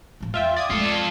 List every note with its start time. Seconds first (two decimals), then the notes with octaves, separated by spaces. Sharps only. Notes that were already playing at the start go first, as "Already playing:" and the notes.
0.20 A2 F3
0.34 E2 F4 E5 G5
0.56 D5 D#6 G#6
0.70 F3 G#3 F4 A4